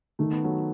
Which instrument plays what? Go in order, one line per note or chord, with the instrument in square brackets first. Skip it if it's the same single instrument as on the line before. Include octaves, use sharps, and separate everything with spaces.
[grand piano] D#3 [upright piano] A3
[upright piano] B3
F#3 A3